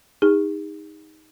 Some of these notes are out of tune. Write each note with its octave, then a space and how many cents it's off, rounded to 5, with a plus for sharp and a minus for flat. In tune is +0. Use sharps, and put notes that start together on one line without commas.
D#4 +10 G#4 -45